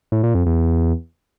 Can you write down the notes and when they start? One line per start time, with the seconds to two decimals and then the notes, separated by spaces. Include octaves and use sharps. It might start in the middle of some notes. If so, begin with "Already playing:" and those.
0.12 A2
0.23 A#2
0.35 F2
0.46 E2